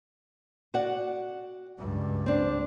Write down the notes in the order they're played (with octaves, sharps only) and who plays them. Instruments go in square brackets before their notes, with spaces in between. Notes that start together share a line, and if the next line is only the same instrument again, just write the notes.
[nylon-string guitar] F#4 D5 F#5
[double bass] C#2 G2
[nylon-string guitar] C4 D4